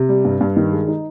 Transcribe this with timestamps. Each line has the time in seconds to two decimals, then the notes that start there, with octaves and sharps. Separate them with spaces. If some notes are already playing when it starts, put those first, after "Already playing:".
Already playing: C3
0.09 G3
0.25 G2
0.41 G2
0.57 D#3
0.73 G#3
0.88 D#4